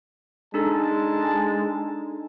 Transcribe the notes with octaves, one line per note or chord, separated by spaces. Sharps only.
G#3 D4 D#4 A4 A5